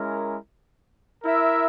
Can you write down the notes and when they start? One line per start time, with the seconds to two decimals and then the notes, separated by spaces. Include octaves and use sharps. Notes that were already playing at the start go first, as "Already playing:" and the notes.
Already playing: G#3 C#4 E4 A#4
1.23 E4 A#4 E5